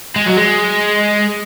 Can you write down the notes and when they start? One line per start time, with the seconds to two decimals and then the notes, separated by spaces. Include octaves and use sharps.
0.16 G#3
0.26 F#3
0.37 G#3